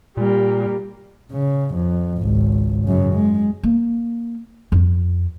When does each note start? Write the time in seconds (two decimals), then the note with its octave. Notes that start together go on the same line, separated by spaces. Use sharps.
0.17 A#2 G3 A#3
1.32 C#3
1.75 F2
2.20 G#1 C#2
2.85 F#2 C#3
3.14 G#3
3.63 A#3
4.72 F2